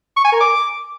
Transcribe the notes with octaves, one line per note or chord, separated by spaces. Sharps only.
C#6
G#5
A#4
D6